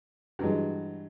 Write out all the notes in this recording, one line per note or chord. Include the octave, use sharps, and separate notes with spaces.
G2 E3 F#3 G#3 F#4